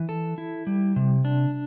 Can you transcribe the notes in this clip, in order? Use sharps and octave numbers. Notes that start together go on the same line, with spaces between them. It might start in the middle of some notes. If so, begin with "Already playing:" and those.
Already playing: E3
A4
E4
G3
C3
D4